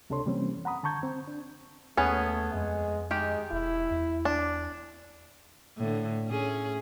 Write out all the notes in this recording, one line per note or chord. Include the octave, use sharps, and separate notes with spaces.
C#2 C3 D4 A4 C#5 C6
C3 E3 G3 A#3 C4 C#4
F#5 A#5 B5 D#6
D3 A5 A#5 C#6 G6 G#6
C4
D4
D#2 A3 B3 C#4 G#4
F2 G#3
D#3 G#3 G4
E1 E4
E2
D4
A2 D3
A2 C#4 G#4